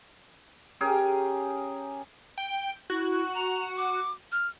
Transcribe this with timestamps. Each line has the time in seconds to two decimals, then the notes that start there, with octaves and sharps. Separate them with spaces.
0.81 C#4 G4 G#4 A#4
2.38 G5
2.90 E4 F#4
3.35 A#5
3.77 D6
4.32 F6